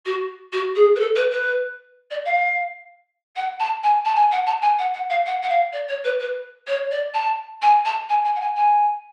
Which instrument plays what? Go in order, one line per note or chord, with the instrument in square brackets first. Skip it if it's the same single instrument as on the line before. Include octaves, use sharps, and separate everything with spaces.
[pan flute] F#4
F#4
G#4
B4
A4
B4
B4
D5
F5
F#5
A5
G#5
A5
G#5
F#5
A5
G#5
F#5
F#5
F5
F#5
F#5
F5
D5
C#5
B4
B4
C#5
D5
A5
G#5
A5
G#5
G#5
F#5
G#5
G#5